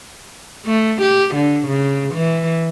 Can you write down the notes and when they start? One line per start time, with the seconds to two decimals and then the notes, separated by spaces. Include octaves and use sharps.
0.66 A3
1.02 G4
1.35 D3
1.68 C#3
2.15 E3